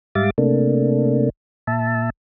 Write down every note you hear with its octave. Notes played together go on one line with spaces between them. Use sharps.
G#2 G3 E5 F5 D6 A6
C3 A3 A#3 D4
A#2 E5 A5